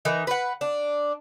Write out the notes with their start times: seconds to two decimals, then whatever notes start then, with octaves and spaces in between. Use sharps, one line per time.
0.05 E3 D#4 A#4
0.27 B4 F#5
0.61 D4